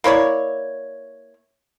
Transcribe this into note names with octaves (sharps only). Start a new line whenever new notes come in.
A#3 E4 C#5 D5